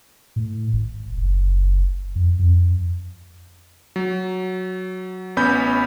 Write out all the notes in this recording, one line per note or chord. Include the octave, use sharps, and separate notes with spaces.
A2
G#1
F#1
F2
F2
F#3
A1 B3 C#4 B5 G6